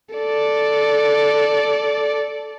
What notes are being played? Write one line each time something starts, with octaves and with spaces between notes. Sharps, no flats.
A4 D5